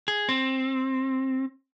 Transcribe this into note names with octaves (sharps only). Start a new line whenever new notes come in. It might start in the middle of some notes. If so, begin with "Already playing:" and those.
G#4
C4